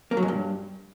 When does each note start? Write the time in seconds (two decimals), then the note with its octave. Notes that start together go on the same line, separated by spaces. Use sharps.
0.11 A#3
0.17 F#3
0.23 G#2
0.28 G2